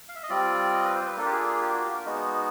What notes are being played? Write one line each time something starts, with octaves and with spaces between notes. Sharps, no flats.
F5
E5
D#5
G3 C4 F4 D5
D#5
B4
C5
B4
A#3 D4 F4 A4
G4
G#4
G#4
G4
F#4
G4
A#4
G#3 B3 D#4 F#4